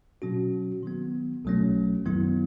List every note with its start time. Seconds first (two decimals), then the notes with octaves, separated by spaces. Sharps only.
0.22 B2 F#3 C#4 F#4
0.83 D#3 F#3 B3
1.45 B1 B2 F#3 A3 C#4
2.06 F#2 D#3 F#3 B3 E4